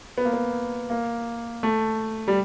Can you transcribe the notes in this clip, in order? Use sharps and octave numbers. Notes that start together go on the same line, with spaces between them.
B3
A#3
B3
A#3
A3
G3